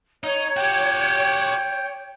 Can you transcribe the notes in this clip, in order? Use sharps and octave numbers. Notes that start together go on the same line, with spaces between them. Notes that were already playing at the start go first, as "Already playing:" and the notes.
D#4 C#5
F#4 G4 G5